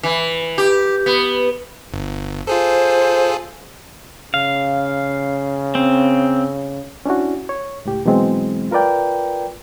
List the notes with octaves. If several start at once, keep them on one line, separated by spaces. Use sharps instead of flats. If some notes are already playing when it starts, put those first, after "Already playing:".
E3
G4
B3
G1
F4 G#4 A4 C5
C#3 F5
C4
C#4 D4 E4 F#4
C#5
C#2 A2 G4
B2 E3 F#3 G#3 C4
F4 A#4 B4 D5 G5